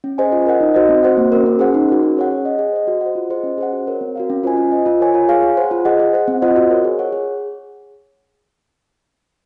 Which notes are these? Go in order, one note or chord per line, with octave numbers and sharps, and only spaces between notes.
C#4
G#4 C5 D#5 G#5
F4
A#4 D#5 F#5
D#4
F#4 C5 D#5
C4
F#4 C5 F#5
A#3
C#4 F#4 A#4
C#4
G#4 C5 F#5
D#4
F#4 A#4
C#4
G#4 C#5 F#5
G#4
D#5 F#5
G#4
C5 D#5
F#4
C5 F#5
F4
G#4 C5 D#5
C#4
G#4 C5 F#5
F#4
A#4 C#5
C4
F#4 A#4 F5
C#4
F4 C5 D#5 G#5
F4
C5 D#5
F4
A#4 C#5 G#5
F4
G#4 C#5 F5 G#5
G#4
C5 F#5
F4
G#4 D#5 F#5
G#4
C5 F#5
C4
F4 C5 D#5 F#5
F#4
A#4 C#5
G#4
C#5 F#5
G#4